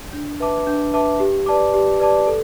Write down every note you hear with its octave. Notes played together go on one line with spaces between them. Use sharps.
D4
B4 E5 A5 D6
D4
B4 E5 A5 D6
G4
B4 D5 A5 D6
G4
B4 D5 A5 D6
A4